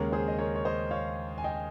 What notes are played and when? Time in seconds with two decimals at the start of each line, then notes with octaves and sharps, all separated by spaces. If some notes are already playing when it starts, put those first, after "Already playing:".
Already playing: D#2 C#3 G#3 C#4 A#4 C#5
0.12 G#4 C5
0.28 D#5
0.39 A#4 C#5
0.56 C#5
0.65 C5 D#5
0.91 C#5 F5
1.38 G#5
1.44 D#5 G5